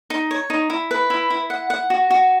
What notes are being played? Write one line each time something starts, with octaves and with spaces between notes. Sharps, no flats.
D#4
C#5
D#4
E4
B4
E4
E4
F#5
F#5
F#4
F#4